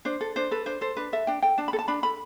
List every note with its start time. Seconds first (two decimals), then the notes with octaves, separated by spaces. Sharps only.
0.05 D4 C5
0.21 A4
0.36 D4 C5
0.51 A4 B4
0.66 D4 C5
0.81 A4 C5
0.97 D4 B4
1.13 A4 E5
1.27 D4 G5
1.42 A4 G5
1.58 D4 A5
1.68 B5
1.73 A4
1.79 A5
1.88 D4 B5
2.03 A4 B5